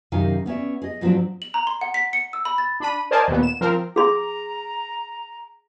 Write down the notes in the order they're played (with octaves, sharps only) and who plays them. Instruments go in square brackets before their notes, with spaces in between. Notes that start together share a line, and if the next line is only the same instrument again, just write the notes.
[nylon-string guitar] F#2 C3 D#3 D#4 F5 G#5
B3 C#4 D5 E5
G#4 D#5
G#2 F3 F#3 B3 C4 D4
[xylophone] F#7
A#5
C6
F#5
B6
C#7
E6
B5
A6
[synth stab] D4 B5 D#7
A#4 C5 D5 D#5 G#5 A5
D#2 A#2 B3
E7
F3 C4 A#4
[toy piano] G#4 C6 [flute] A#5